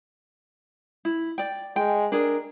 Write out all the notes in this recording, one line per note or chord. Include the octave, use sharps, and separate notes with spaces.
E4
D5 G5
G#3 G5
D4 G#4 A#4